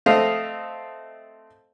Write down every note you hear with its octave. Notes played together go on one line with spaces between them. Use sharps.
A3 C4 D#5 F5